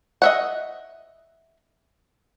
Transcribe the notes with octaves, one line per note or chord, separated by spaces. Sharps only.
D#5 E5 F#5